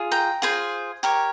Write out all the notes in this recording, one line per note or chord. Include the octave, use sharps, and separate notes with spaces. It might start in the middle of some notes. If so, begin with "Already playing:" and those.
Already playing: F4 G#4
G5 A#5
F4 G#4 C5
G4 A#4 C#5